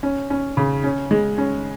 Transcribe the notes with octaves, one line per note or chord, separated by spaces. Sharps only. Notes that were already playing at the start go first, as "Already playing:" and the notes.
C#4
C#4
C#3
C#4
G#3
C#4